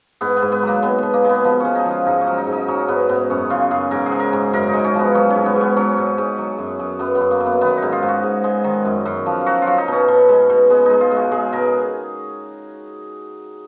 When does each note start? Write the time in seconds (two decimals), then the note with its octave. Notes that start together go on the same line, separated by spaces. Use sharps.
0.21 G#2 B3
0.37 B3
0.42 G#2
0.52 B3
0.63 F#3 A#3
0.83 G#3 B3
0.98 B2 B3
1.13 A#3
1.24 G#3 B3
1.44 F3 B3
1.60 G#3 C#4
1.75 D#4
1.86 F3
1.91 F4
2.06 G#2 D#4
2.21 C#4
2.27 F#3
2.38 D#4
2.47 G#2
2.52 D#4
2.68 F#3 C#4
2.88 G#2 B3
3.09 G#2 B3
3.30 F#2 C#4
3.50 C#3 F4
3.71 F#2 G#4
3.91 G#2 A#4
4.06 G#4
4.12 F#3
4.20 A#4
4.33 G#2
4.53 F#2 A#4
4.68 D#4
4.74 G#3
4.84 C#4
4.95 F3 B3
5.15 F#3 C#4
5.30 C#4
5.35 G#2
5.46 B3
5.56 G#2 B3
5.76 F#3 C#4
5.97 G#2
6.18 G#2
6.38 F#3
6.58 F#2
6.79 F#2
6.99 F#2 B3
7.15 B3
7.21 F#2
7.31 A#3
7.40 F#2
7.46 B3
7.61 D#3 B3
7.77 D#4
7.82 G#2
7.92 F4
8.03 G#2
8.08 F#4
8.23 G#2
8.44 G#3
8.64 D#3
8.85 F#2
9.06 F#2
9.26 F3
9.46 F#3 F#4
9.62 F4
9.67 F#3
9.78 D#4
9.88 B2 C#4
10.08 B2
10.29 G#3
10.50 B2
10.70 G#3 B3
10.86 G#3 D#4
11.01 F4
11.11 G#3
11.16 F#4
11.31 G#3 G#4
11.52 B2 A#4